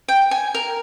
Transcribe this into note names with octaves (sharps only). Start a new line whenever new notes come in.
G5
G#5
A#4